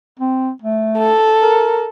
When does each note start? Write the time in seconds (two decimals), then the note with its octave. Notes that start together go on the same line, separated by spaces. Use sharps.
0.20 C4
0.62 A3
0.98 A4
1.42 A#4